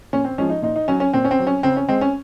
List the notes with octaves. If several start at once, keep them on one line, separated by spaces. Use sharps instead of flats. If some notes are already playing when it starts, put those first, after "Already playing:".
A#2 C#4
C4
F3 G#3 C#4
D#4
A#2 D#4
D#4
F#3 C#4
C#4
A#2 C4
C#4
C4
F#3
C#4
C#3 C4
C#4
G#3 C4
C#4